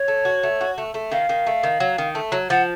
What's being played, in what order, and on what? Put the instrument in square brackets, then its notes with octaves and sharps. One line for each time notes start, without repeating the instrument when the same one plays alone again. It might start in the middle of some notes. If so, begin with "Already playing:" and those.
Already playing: [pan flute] C#5
[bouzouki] A3
F#4
A3
F#4
A3
A3
[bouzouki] D#3 [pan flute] F5
[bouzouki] D#3
A3
D#3
F#3
D#3
A3
F#3
[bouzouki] F3 [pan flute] F#5